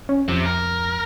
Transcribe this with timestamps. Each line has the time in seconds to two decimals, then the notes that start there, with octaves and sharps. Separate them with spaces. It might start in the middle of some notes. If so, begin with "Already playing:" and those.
0.09 C#4
0.28 F2 C3
0.46 A#4